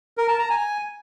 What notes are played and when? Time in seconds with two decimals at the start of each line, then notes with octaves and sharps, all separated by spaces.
0.18 A#4
0.28 A5
0.39 A#5
0.50 G#5